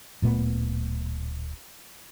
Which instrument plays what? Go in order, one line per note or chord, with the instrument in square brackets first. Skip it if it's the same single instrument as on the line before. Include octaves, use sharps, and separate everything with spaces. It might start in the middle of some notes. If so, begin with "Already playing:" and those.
[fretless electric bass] D1 A#2 A3 B3